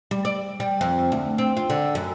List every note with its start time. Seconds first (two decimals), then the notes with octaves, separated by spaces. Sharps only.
0.11 G3
0.25 D5
0.60 G3
0.81 F2
1.12 D2
1.38 C4
1.57 F4
1.70 D3
1.95 F#2